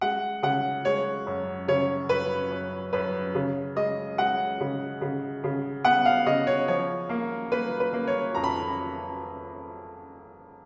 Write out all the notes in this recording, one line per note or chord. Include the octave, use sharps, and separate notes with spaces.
G#3 F#5
C#3 F#5
G#3 C#5
F#2
C#3 C#5
F#2 B4
F#2
F#2 B4
C#3
G#3 D#5
G#3 F#5
C#3
C#3
C#3
B3 F#5
F5
C#3 D#5
C#5
F3 C#5
A#3
A#3 B4
B4
A#3
C#5
F2 A#5
B5